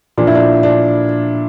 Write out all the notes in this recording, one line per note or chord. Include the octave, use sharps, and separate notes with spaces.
A#2 F3 D4
E4
D4
D4